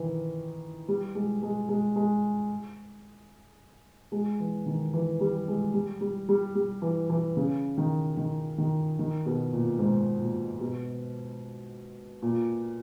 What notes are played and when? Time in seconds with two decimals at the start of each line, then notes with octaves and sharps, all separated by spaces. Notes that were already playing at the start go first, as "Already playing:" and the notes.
Already playing: D#3 E3
0.88 G3
1.15 G#3
1.43 G#3
1.69 G#3
1.96 G#3
4.12 G#3
4.40 E3
4.66 D#3
4.93 E3
5.21 G3
5.48 G#3
5.74 G3
6.01 G3
6.29 G3
6.55 G3
6.82 E3
7.10 E3
7.37 C#3
7.78 D#3
8.17 D#3
8.58 D#3
8.99 D#3
9.26 B2
9.53 A#2
9.79 G#2
10.21 A#2
10.60 B2
12.22 A#2